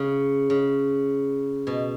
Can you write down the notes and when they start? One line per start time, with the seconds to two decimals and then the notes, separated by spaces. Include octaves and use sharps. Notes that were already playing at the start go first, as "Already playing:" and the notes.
Already playing: C#3
0.50 C#3
1.67 B2